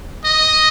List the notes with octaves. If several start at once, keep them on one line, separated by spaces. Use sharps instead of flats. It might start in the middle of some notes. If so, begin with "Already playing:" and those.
D#5